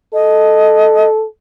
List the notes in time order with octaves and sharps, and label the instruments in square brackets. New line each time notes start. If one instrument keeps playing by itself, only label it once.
[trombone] A4 [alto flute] D#5